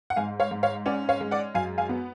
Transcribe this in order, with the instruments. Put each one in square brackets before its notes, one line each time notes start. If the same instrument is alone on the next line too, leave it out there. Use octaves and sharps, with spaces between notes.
[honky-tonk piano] F#5
G#2 F5 G#5
C#5 F5
G#2
C#5 F5
C#4 D5 F#5
C#5 F5
G#3
D5 F#5
F#2 F5 G#5
F5 G#5
B3